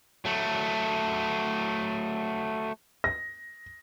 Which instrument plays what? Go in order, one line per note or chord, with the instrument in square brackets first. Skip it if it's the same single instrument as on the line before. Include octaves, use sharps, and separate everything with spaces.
[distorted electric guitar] F#3 A3
[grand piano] A#6